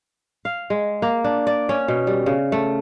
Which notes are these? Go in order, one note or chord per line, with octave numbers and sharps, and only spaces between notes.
F5
G#3
A#3
D4
D5
C#4
B2
G3
C#3
A3